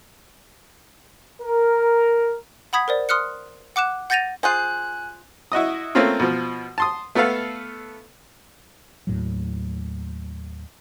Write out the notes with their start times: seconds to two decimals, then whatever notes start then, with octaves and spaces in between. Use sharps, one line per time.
1.42 A#4
2.73 F#5 B5 D#6 G#6 B6
2.88 A#4 C5 D5
3.09 C6 D#6 F6 F#6 C#7
3.76 F#5 D6 F#6 E7
4.10 F#5 G6 A6 A#6 D#7 F7
4.43 F4 G#4 C5 G#5 F#6
5.52 E4 F#4 D#5 D#6
5.95 A3 A#3 C4 C#4 F4
6.20 B2 F3
6.78 A5 C6 D#6
7.15 A3 B3 A4 B4 F5
9.07 D#2 A2 F#3